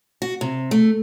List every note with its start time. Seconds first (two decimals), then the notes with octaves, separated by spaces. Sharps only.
0.22 F#4
0.41 C3
0.71 A3